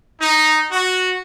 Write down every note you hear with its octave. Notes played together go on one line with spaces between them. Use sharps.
D#4
F#4